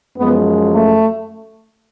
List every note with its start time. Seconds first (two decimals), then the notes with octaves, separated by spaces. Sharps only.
0.17 F#2 F3 G#3 B3
0.73 A3